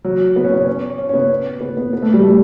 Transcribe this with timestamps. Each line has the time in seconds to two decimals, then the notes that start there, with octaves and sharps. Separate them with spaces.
0.04 F#3
0.36 B3
0.45 C#4
0.54 B3
0.67 C#4
0.98 C#4
1.09 C#4
1.14 B3
1.61 B3
1.77 B3
1.93 B3
2.02 A3
2.14 G3
2.23 A3